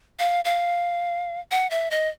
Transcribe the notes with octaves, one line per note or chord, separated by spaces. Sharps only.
F5
F5
F#5
E5
D#5